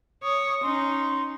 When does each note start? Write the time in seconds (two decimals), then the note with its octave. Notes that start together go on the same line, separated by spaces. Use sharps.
0.23 C#5 D#6
0.63 C#4 D#4 C6